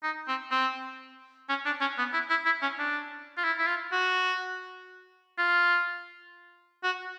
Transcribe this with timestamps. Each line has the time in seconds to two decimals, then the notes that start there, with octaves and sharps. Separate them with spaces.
0.03 D#4
0.28 C4
0.51 C4
1.49 C#4
1.66 D4
1.81 C#4
1.98 B3
2.13 E4
2.30 E4
2.46 E4
2.62 C#4
2.79 D4
3.38 F4
3.44 E4
3.59 E4
3.67 F4
3.92 F#4
5.38 F4
6.84 F#4